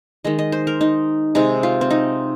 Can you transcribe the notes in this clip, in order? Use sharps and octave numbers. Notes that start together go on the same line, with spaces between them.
D#3 G#3 D#5
D#5
C5
A#4
D#4
C3 G#3 D#4
F4
C4
D#4